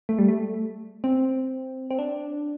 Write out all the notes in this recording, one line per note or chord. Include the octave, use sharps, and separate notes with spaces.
A3
G3
A3
C4
C4
D4